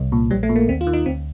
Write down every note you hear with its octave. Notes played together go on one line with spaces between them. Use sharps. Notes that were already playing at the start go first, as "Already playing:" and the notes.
Already playing: C2
A#2
A#1 G3
A3
A#2
A#3
D#2 C4
F4
D#3
D#4
D2 C4